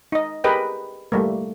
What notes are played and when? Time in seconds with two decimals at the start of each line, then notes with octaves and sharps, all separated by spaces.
0.12 D#4 D#5
0.44 G4 G#4 A#4 B4 D#5 G5
1.12 G3 A3 A#3